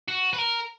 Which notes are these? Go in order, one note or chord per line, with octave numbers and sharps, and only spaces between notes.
F#4
B4
A#4